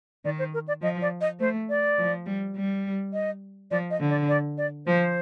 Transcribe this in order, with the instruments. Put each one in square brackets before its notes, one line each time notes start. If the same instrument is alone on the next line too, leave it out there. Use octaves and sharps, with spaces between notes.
[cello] D#3 [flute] D5
[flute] C5
A#4
D5
[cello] F3 [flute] D#5
[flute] D5
D#5
[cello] A3 [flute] C5
[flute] D5
[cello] F3
G3
G3
[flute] D#5
[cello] F3 [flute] D5
[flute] D#5
[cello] D3
[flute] D5
D5
D5
[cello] F3 [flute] C5